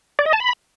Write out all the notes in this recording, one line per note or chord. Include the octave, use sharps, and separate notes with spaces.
D5
D#5
A5
B5